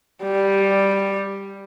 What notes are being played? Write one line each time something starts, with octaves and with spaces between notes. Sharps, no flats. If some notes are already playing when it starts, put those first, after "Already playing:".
G3